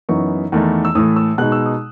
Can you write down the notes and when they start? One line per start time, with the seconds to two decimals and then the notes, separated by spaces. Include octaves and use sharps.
0.09 F#2 E3 B3 D#4 C#6
0.52 E2 D#3 A3 D#4
0.85 E6
0.95 A2 E3 A3 D#6
1.16 E6
1.38 B2 G#3 D#4 F#6
1.52 E6
1.66 D#6